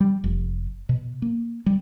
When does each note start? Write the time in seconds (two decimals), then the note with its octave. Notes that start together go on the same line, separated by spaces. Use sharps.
0.01 G3
0.24 F1
0.89 B2
1.22 A#3
1.66 G3